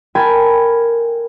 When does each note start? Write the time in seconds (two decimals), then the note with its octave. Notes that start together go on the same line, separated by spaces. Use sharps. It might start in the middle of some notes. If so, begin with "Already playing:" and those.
0.15 A4 A#4 G5 G#5 B5